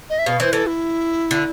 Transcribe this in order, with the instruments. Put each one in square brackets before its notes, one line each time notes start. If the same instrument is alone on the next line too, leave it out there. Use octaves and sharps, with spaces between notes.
[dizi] D#5
E5
[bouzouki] B2 [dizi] F5
[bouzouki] E3 [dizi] C5
[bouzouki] E3 [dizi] A4
[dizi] E4
[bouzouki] D3